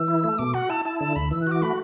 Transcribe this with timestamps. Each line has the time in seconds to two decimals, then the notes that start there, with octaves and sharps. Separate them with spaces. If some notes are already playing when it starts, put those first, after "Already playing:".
Already playing: E3 E6
0.08 E4
0.24 A3
0.39 B2 D6
0.54 F#4 F#5
0.70 E4 A5
0.85 E4 A5
1.00 D3 A5
1.16 D2 B5
1.31 E3 E6
1.42 F#6
1.47 F#4 D6
1.62 A3 B5